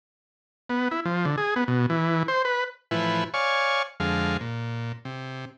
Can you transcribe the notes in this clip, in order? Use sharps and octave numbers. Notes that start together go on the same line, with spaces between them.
B3
E4
F3
D3
G#4
B3
B2
E3
C5
B4
A2 E3 F3 E4 B4
C#5 D5 F5 G#5 C#6
F2 D3 G#3 F5
A#2
C3